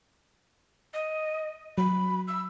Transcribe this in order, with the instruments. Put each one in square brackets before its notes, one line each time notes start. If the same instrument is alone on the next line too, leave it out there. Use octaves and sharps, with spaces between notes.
[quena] D#5
[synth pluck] F#3 [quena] B5
[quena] E6